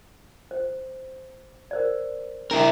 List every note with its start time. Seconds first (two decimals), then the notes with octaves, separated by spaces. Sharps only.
0.51 C5
1.71 A#4 C5 D5
2.51 D4 E4 A#4 G5